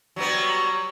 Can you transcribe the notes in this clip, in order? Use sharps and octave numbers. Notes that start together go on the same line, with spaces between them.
F#3 G3 B3